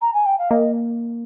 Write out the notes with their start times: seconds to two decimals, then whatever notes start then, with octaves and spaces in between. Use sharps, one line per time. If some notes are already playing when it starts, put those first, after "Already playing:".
0.00 A#5
0.13 G#5
0.25 G5
0.38 F5
0.49 A#3 D#5